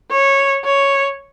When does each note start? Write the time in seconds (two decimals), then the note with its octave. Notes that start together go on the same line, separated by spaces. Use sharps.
0.11 C#5
0.64 C#5